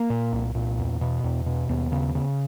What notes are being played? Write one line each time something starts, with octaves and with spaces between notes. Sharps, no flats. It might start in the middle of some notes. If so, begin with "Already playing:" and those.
Already playing: A#3
A#2
C2
A#2
E2
B2
E2
B2
D#2 B3
C#3
C#3